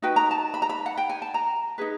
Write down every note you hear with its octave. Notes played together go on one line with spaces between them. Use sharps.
D#4 F#4 B4 G5
A#5
A5
B5
A#5
B5
F#5
G5
G#5
A5
A#5
D#4 G#4 B4